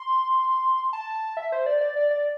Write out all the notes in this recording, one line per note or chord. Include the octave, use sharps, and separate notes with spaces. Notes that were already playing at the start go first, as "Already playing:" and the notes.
Already playing: C6
A5
E5
C5
D5
D5
D5
D5